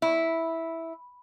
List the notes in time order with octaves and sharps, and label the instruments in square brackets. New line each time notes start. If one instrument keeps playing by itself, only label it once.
[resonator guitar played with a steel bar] E4